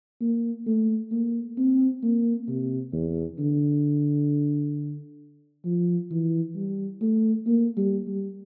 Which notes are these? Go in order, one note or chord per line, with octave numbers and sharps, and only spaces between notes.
A#3
A3
A#3
C4
A#3
C3
E2
D3
F3
E3
G3
A3
A#3
G3
G3